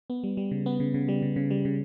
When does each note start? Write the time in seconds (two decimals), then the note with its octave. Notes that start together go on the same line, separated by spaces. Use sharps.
0.10 B3
0.23 G3
0.37 G3
0.51 C#3
0.66 B3
0.80 C#3
0.94 C#3
1.08 G3
1.22 C#3
1.36 C#3
1.50 G3
1.65 C#3